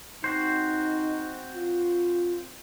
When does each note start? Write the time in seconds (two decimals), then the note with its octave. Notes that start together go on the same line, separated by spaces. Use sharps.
0.24 C4 D#4 F#4 C5
1.55 F4